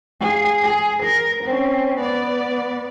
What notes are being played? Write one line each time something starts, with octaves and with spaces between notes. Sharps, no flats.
G#4 F5
G#4
A#4
C4 C#4
B3 D5